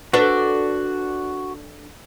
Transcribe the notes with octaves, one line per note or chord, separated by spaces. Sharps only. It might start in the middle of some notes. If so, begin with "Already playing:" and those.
D4 F#4 A4 B4